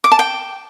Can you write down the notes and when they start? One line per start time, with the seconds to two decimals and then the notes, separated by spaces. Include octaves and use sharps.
0.04 D6
0.12 A5
0.19 G5